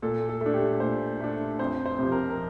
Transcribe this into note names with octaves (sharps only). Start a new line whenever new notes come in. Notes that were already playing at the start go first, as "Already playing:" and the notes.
A#2 A4
A4
A3 D4
G4
A#2 C5
A3 D4
F2 C5
C5
C3 F3
A#4
A#4